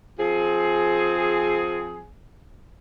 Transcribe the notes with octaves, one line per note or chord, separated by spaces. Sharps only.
F3 C4 G#4